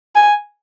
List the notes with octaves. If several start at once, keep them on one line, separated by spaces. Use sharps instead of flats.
G#5